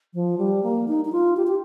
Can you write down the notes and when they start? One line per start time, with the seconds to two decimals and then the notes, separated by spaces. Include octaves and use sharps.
0.14 F3
0.38 G3
0.63 A#3
0.88 D#4
1.05 D#4
1.12 F4
1.37 G4
1.47 G4